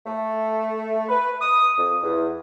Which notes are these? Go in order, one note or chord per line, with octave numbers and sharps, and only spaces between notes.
A3
B4
D#6
F2
E2